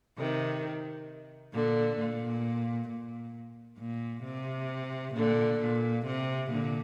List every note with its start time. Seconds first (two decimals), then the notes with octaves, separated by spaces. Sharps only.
0.17 C3 D#3
1.53 A#2 D3
1.98 A#2
2.88 A#2
3.79 A#2
4.24 C3
5.15 A#2 D3
5.60 A#2
6.05 C3
6.50 A#2 D3